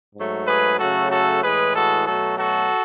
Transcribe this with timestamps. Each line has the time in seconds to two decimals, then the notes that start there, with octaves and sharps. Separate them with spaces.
0.15 G#2 F#3 A3
0.47 G#4 B4
0.79 C#3 F#3 A3 F#4 A4
1.11 F#4 A4
1.42 A2 E3 G#3 G#4 B4
1.74 F#4 A4
2.06 B2 F#3 A3 F#4 A4
2.38 F#4 A4